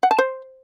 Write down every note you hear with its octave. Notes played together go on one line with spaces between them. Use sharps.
F#5
A5
C5